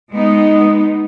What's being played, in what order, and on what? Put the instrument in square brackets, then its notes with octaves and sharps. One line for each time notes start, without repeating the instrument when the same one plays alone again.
[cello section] G#3 B3 D#4